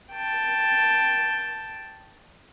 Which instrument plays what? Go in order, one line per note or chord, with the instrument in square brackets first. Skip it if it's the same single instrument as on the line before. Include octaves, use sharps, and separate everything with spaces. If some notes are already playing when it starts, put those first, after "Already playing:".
[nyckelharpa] G5 A5